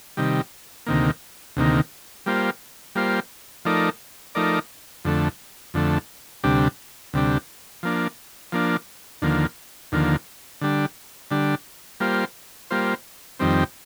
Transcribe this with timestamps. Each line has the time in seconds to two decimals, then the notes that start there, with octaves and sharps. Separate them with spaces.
0.17 C3 D#3 G3
0.87 D2 C3 D#3 A#3
1.57 D2 C3 D#3 A#3
2.26 G3 A#3 F4 C5
2.95 G3 A#3 F4 C5
3.65 F3 A3 D#4 A#4 D5
4.35 F3 A3 D#4 A#4 D5
5.05 F2 D3 A3
5.74 F2 D3 A3
6.44 D2 C3 G3 D4
7.13 D2 C3 G3 D4
7.83 F3 A#3 D4
8.52 F3 A#3 D4
9.22 D#2 D3 F3 A#3
9.92 D#2 D3 F3 A#3
10.61 D3 G3 D4
11.31 D3 G3 D4
12.00 G3 A#3 F4 C5
12.71 G3 A#3 F4 C5
13.40 F2 D#3 G3 C4